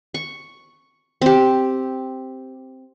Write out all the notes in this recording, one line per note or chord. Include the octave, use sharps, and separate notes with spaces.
C#6
C4 G4